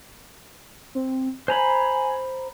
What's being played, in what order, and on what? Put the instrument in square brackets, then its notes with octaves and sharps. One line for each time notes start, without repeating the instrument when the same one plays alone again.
[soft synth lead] C4
[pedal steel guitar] C5 A#5 B5 [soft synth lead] G#5